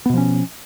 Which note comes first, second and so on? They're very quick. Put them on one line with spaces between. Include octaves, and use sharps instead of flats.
B3 B2 F3 C#4